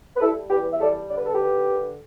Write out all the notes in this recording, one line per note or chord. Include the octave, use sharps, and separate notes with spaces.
B4
G3 E4 A4
E2 G4 B4
E5
G3 A4 D5
D3 D5
B4
A4
D3 G4 B4
D3